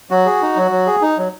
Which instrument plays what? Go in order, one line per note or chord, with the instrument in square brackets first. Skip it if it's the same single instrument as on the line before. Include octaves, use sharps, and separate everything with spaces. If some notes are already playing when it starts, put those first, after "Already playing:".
[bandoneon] F#3 [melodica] F#4
[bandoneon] G#4
D#4
F#3
F#3
G#4
D#4
F#3